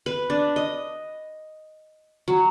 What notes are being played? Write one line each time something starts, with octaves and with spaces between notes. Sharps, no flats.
B4
D4
D#5
F#3